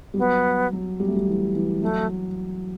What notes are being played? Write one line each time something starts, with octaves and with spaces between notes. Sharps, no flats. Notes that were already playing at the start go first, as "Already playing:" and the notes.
G3
F#3 B3
F#3
G3
A3
G3
E3
E3
F#3 A3